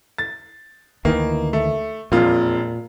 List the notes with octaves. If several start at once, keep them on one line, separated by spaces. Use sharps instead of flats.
A6
D2 D#3 E3 A#3
A3
E1 F2 A#2 F4